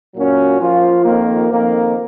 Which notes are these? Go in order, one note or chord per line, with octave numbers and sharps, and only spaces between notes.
A#2 F#3 A#3 C#4 F#4
F3 A#3 F4
F2 D#3 A#3
F2 D#3 A#3